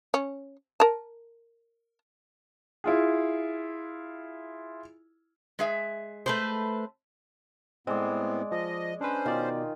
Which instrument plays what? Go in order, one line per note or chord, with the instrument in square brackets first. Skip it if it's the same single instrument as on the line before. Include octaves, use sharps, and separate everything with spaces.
[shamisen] C#4
A#4 A5
[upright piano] E4 F4 G#4
[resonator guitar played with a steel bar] G#3 G#4 E5
[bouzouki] A3 B4 C5
[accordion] A2 B3 [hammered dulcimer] G#3 D5 [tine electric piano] C4
[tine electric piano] F3 [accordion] D#5
[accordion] C#4 C5 [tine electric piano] D4 B4
[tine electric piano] B2 D5 [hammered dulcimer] D#3 F4